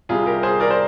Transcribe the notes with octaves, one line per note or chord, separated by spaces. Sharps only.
C2 C3 G3 F4 G#4
G4 A#4
G#4 C5
A#4 D5
C5